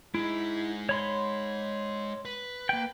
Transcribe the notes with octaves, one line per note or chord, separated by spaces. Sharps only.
G#3 D#4 E4
C#5 B5 C6
B4
A#3 G5